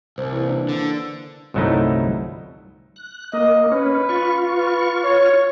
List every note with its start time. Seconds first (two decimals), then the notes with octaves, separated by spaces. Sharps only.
0.18 C2 C5
0.32 E3 A#3
0.49 D4
0.69 D3
1.54 G1 C2 F#3 A3 D#4 E4
2.96 F#6
3.33 A#3 D#5
3.72 C#4 B4
4.09 F4 C#6
4.57 B4
5.04 C#5